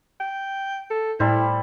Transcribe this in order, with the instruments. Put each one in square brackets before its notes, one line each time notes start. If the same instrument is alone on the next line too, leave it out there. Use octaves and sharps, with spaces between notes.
[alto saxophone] G5
A4
[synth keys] A2 [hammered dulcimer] G3 A4 C5 [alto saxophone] E4